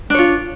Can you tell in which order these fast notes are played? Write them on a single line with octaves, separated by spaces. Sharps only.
D4 C#5 F4